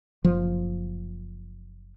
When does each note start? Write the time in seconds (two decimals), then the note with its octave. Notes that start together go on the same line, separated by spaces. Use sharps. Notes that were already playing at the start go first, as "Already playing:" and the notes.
0.24 F#1 F3